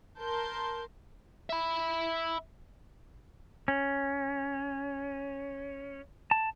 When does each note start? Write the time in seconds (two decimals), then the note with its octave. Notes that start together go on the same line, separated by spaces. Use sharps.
0.21 A#4 A5 C6 G6
1.50 E5 B5
3.68 C#4
6.31 A5